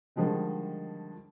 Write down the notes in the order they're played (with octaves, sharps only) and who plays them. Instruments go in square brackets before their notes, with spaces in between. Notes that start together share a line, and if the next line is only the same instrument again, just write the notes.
[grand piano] D3 D#3 F3 G3 G#3